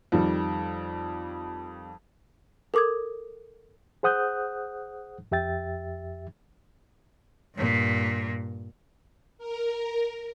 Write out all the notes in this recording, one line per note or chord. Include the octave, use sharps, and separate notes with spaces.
F2 D#3 G3
A4 A#4 D6 D#6 G#6
G#4 C5 F#5 D#6 F#6 G6
F2 G4 E5 G5 A6
G2 A#2
A#4